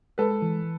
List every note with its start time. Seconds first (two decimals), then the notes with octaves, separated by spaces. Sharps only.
0.18 G#3 A4 B4
0.42 E3